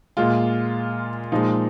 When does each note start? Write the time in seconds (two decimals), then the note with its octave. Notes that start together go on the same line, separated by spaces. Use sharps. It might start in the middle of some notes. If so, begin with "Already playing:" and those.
0.17 A#2 G#3 F4
1.32 A#2 F3 G#3 D#4